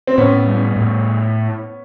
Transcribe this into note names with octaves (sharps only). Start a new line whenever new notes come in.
C4
A2 B3 C#4
G3
A2